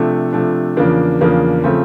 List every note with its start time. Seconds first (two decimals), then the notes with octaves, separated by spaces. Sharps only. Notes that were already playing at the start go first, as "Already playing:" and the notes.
Already playing: C3 F3 A3 D4
0.33 C3 F3 A3 D4
0.77 E2 C#3 F3 A#3 D4
1.21 E2 C#3 F3 A#3 D4
1.64 C#3 F3 A3 C4